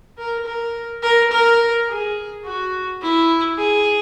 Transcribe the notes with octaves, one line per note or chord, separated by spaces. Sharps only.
A#4
A#4
A#4
A#4
G#4
F#4
E4
G#4